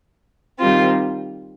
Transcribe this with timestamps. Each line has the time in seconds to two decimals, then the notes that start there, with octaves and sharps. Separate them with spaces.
0.59 D#3 G3 C4 F4